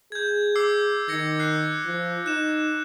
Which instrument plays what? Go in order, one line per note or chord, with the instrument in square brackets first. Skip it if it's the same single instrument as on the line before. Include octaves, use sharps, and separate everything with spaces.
[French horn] G#4 [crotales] G6 G#6
[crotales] D6 E6 C7
[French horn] D#3 [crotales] G#6 A#6 C#7
[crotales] F#6 C7
[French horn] F3
[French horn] D#4 [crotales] F#6 E7